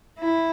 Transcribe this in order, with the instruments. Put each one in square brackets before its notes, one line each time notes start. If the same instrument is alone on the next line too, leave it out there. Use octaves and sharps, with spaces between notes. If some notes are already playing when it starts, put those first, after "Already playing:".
[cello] E4